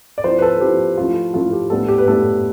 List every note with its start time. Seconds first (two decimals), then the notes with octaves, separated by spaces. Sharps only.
0.18 D5
0.24 F3 C4 E4 C5
0.38 B4
0.42 A4
0.60 F3 C4 E4 G4
0.97 F3 A3 E4 F4
1.34 F3 A3 E4 F4
1.53 G4
1.70 A2 G3 B3 D4 A4
1.88 G4
1.98 B4
2.07 A2 G3 B3 D4 A4